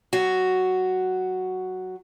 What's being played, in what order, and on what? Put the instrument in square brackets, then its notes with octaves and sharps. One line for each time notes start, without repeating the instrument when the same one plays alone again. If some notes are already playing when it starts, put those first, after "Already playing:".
[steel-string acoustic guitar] F#3 F#4